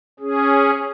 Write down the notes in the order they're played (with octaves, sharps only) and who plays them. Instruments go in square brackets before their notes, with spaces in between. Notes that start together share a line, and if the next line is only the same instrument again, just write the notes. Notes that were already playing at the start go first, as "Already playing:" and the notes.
[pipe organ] C#4 G#4